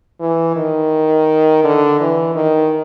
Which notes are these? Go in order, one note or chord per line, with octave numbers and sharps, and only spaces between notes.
E3
D#3
D3
E3
D#3